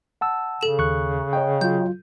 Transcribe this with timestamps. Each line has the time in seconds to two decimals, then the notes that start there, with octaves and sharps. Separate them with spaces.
0.21 F#5 A5 E6
0.61 C#3 A4 E7
0.79 D#2 C#6 F#6
1.33 C#5 D#5 G5
1.61 F#3 F4 G6